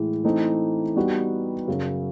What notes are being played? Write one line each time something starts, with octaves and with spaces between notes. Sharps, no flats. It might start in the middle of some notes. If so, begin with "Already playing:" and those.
Already playing: A2 E3 G#3
E3 A3 C4 D#4
G3 B3 D#4 F#4 B4
F#2 C#3 F#3